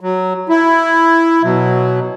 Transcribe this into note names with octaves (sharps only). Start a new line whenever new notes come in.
F#3
E4
B2 F#3